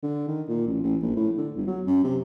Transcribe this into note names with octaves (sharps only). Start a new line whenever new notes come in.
D3
D#3
A#2
A1
A1
A#1
A2
D3
G1
F#3
F#2
C3